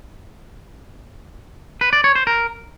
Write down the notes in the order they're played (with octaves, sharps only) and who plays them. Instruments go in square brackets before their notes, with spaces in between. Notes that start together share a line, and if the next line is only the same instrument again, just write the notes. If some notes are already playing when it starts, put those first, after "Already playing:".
[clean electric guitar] B4
D5
C#5
C5
A#4